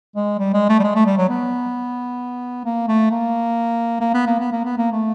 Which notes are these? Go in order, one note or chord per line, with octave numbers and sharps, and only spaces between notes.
G#3
G3
G#3
A3
G3
G#3
A3
G3
F#3
B3
A#3
A3
A#3
A#3
B3
A#3
B3
A#3
B3
A#3
A3